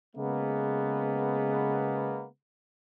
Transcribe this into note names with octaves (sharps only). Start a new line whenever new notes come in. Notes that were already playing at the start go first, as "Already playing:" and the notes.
C#3 G#3 A#3 B3